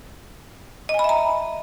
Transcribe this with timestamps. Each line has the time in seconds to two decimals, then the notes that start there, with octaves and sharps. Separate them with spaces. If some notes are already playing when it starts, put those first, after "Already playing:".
0.89 D#5
0.94 G#5
0.99 B5
1.04 E5
1.09 A#5